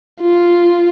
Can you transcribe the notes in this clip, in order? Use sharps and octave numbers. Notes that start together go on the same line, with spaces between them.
F4